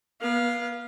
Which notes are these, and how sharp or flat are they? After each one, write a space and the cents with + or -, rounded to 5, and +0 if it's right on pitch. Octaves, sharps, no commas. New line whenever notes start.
B3 -30 F5 +0